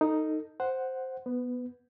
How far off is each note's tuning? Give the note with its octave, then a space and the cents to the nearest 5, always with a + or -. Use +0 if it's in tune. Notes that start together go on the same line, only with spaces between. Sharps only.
D#4 +0 A4 +30
C5 +0 F#5 +0
B3 -5 B4 +20